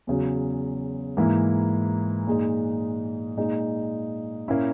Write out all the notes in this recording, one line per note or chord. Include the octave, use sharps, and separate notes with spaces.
E2 C#3 F#3
G#2 E3 A#3 E4
A#2 G#3 D#4
A#2 G#3 D#4
A#2 A#3 C#4 E4